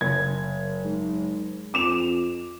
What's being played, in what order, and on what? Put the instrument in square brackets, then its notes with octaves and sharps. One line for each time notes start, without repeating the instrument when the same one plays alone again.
[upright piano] F#1 G#6
[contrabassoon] G#2
[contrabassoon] F2 [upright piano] D6 E7 F7